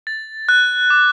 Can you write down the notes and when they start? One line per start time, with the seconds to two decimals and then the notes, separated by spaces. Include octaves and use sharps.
0.07 A6
0.49 F#6
0.90 D6